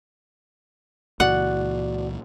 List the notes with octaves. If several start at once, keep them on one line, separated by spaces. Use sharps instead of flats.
C#2 A#2 E3 F#4 D5 F#5